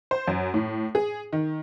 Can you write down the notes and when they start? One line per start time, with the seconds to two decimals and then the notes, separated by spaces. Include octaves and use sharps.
0.11 C5
0.28 F#2
0.54 A2
0.95 G#4
1.33 D#3